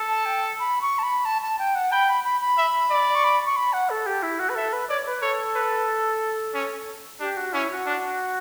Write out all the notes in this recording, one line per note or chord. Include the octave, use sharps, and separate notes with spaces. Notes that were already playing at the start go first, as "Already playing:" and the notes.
Already playing: A4
A5
G5
B5
C#6
A5
B5
A5
A5
G5
F#5
G5 B5
B5
B5
B5
E5
D5
C#6
B5
C#6
B5
F#5
A4
G4
E4
F#4
B4
A4 E5
B4
C#5 D5
B4
A4 C#5
B4
C#4
D4 G4
F#4
C#4 E4
F#4
D4